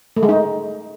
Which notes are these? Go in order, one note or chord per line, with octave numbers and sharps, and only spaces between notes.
A3
G#3
D#4